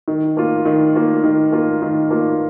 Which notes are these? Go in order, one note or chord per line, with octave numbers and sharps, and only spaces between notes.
D#3
A#3 F4
D#3
A#3 F4
D#3
A#3 F4
D#3
A#3 F4